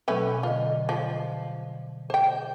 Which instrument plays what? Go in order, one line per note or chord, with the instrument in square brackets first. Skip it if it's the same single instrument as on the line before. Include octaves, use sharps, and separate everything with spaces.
[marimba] B2 F#3 [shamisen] A3 C#4 B4
[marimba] D3 D#5 [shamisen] F4
[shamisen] F3
C5 G5